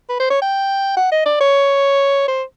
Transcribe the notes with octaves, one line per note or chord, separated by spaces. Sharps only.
B4
C5
C#5
G5
F#5
D#5
D5
C#5
C5